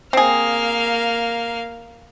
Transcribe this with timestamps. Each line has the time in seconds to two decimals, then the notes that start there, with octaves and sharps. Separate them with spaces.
0.13 A#3 C4 G#4 F5